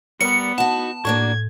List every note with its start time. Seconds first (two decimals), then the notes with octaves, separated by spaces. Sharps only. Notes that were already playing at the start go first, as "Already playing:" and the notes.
0.21 G3 B3 A#4 D5 C#7
0.58 D#4 F#4 F#5 A5
1.05 A2 A#3 D4 F#4 G#6